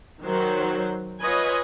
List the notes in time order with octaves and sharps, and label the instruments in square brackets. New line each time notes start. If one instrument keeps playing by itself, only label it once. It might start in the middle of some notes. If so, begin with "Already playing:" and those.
[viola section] D#3 F#3 C5
F4 B4 C#5 D#5 G#5